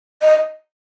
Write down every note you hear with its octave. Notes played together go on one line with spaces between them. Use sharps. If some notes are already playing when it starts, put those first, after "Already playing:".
D#5